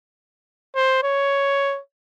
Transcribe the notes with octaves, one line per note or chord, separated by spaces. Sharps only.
C5
C#5